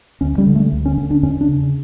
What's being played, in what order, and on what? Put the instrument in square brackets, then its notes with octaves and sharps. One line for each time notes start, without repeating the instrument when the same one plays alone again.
[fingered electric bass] D2 C#4
G3
D3
A3
D2
C#4
D3 C#4
D4
E2 C#4
D4
C#3